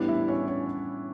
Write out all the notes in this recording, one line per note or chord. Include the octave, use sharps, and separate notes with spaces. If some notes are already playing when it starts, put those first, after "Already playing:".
Already playing: A2 E3 G3 B3 D4 D5
E4 E5
C#4 C#5
C#4 C#5